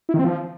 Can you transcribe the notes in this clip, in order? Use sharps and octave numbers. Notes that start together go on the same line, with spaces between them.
E4
D#3
C4
F3